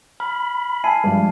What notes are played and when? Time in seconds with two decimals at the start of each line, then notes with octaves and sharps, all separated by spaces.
0.20 B5 F6
0.84 E5 G#5 A5 C7 D#7
1.04 G2 F3 G#3